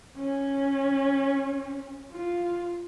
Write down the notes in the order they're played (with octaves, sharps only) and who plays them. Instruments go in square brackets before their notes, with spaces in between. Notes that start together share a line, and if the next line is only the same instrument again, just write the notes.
[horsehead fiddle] C#4
F4